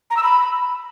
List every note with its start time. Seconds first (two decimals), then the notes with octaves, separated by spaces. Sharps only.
0.10 A#5
0.17 E6
0.23 B5